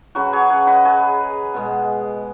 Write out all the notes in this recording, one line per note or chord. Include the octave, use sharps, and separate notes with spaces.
C#3 F#3 F#4 B4
G#4 C#5
C#5 F#5
B4 D#5
G#4 C#5
B2 G#3